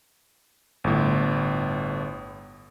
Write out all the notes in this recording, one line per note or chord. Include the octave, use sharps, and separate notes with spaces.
G1 A2